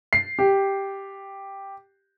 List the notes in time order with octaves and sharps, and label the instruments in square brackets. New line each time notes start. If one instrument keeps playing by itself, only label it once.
[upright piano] C7
G4